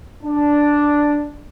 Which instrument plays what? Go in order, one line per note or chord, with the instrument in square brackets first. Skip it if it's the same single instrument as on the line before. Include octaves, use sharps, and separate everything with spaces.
[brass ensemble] D4